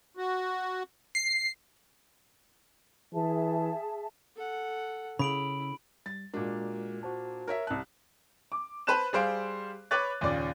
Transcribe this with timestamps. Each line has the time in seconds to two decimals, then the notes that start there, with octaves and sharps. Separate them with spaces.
0.17 F#4
1.15 C7
3.13 E3 G#4 E5 A5
4.36 A4 F#5
5.19 C#3 E4 B5 D7 F#7
6.06 G3 A6
6.34 A#2 G#3 D4 F#4 A#4
7.03 F#4 C5 A5
7.48 A#4 C#5 E5
7.67 C2 A5 F#6
8.52 D6
8.87 B4 C5 A5 F#6 E7
9.13 G3 G#4 C5 F5 D7
9.91 B4 C#5 B5 D6 F#6 A6
10.21 D#2 A#2 C#3 D5